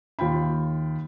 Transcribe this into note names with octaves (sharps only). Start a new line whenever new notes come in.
D#2 F4 G5 B5